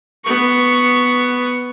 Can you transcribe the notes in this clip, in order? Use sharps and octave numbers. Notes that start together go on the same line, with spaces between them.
B3 C#6